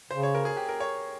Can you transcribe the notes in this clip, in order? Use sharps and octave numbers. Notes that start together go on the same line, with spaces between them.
C#3 C5
C#5
A#4
G#4
G4
A#4
C#5